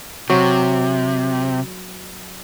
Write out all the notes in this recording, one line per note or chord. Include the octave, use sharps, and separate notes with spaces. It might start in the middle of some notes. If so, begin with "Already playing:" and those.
C3 F#3